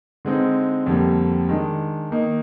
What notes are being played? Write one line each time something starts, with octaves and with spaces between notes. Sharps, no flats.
D3 G#3 C4 D#4
F2 D3 G3 A#3
D#3 G#3 D4
D#3 A#3 D#4